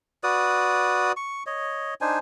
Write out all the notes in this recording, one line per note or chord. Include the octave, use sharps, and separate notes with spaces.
F#4 B4 D5 D#6
C#6
C#5 D#5
D4 D#4 C5 G#5